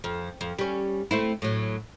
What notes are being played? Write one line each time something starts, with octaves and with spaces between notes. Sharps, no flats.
F2
F2
G3 C#4
A3 C4 E4
A2 F#3